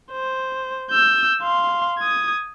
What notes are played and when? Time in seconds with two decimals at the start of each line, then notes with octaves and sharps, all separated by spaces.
0.12 C5
0.91 E6 G6
1.40 F5 C6
1.98 D#6 G#6